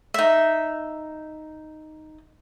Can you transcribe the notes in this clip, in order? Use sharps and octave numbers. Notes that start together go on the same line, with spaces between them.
D#4 E5